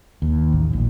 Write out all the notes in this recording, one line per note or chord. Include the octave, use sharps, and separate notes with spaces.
D#2
A1
A#1